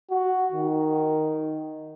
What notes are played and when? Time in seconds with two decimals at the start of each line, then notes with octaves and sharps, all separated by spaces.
0.10 F#4
0.52 D#3